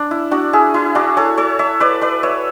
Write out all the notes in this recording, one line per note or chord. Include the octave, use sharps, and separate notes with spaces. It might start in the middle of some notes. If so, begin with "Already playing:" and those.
Already playing: D4
E4
D4 F#4
E4 G#4
E4
D4 F#4
A4 C#5
A4 C#5
C#5 E5
B4 D5
B4 D5
C#5 E5